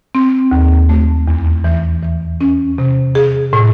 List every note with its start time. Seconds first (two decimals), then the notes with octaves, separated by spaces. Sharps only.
0.15 C4
0.51 D#2
0.89 A3
1.28 E2
1.64 E3
2.02 E3
2.41 C#4
2.78 C3
3.15 G#4
3.53 A2